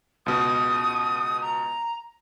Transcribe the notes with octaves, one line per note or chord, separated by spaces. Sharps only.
C#2 B2 D#6
A#5